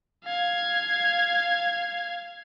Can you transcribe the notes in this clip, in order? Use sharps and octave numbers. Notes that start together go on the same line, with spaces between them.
F5 G#6